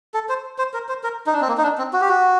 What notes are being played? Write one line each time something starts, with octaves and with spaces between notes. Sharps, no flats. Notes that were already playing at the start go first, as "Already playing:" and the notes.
A4
C5
C5
A#4
C5
A#4
D#4
D4
C4
A#3
D#4
D4
C4
F#4
G4
F#4